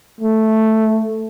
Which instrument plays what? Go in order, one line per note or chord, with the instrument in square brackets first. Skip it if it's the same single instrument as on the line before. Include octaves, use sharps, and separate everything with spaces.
[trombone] A3